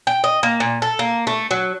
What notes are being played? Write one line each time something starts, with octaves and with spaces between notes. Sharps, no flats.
G5
D#5
A#3
A#2
A4
A#3
A3
F#3